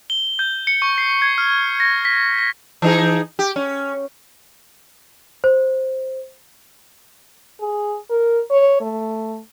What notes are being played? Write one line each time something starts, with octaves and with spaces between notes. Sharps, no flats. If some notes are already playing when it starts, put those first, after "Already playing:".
G7
G6
C#7
C#6
C7
G#6
F6
A#6
B6
A#6
E3 D#4 G#4
G4
C#4
C5
G#4
A#4
C#5
A3